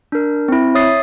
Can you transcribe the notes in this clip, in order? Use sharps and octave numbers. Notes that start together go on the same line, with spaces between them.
D4 A#4
C4 E4
C#5 E5 D#6 A6 C7